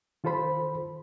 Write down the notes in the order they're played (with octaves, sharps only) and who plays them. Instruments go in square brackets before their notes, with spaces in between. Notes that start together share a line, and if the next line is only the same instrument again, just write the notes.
[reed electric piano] D#3 F4 A4 C5 B5